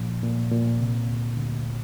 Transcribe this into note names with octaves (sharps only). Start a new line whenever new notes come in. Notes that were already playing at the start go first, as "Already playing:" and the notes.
Already playing: A#2 F3
A#2
A#2
C3
D2
D2